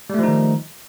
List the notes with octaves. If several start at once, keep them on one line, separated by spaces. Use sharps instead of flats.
D#3 F3 G3 A3 D#4